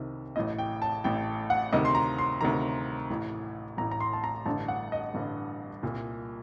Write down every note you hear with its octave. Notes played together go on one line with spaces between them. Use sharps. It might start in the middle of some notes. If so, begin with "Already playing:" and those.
Already playing: C2 C3 D#3
A1 A2 D#5
G5
A5
A1 A2 G5
F#5
D2 C3 D#3 D#5
C6
A#5
C6
D2 C3 D#3 A#5
A1 A2
A1 A2 A#5
A#5
C6
A5
A#5
A1 G2 D3 A5
F#5
D#5
A1 G2 D3
C2 A#2